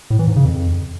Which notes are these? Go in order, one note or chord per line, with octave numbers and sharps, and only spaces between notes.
A2
E3
G#2
C#3
F2